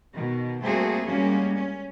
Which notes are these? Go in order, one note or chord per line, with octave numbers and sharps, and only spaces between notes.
B2 D#3
G3 A3 A#3 C4 F#4 G#4
G3 G#3 A#3 C#4 F#4
C#4